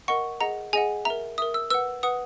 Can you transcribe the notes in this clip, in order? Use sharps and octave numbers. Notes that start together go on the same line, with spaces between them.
A#4 D#5 F#5 C#6
G#4 D#5 F#5 A#5
G#4 D#5 F#5 G#5
A#4 E5 A#5
A#4 E5 D#6
E6
B4 F#5 E6
B4 F#5 D#6